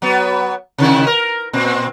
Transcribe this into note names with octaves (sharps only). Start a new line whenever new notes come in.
F#3 B3
C3 D#3 E4
A#4
A#2 C4